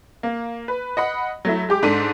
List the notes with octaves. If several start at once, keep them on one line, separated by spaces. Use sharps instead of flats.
A#3
B4
D#5 F#5 B5
F#3 A3 E4
G#3 G4 D6
G#2 D4 A4 B6 D#7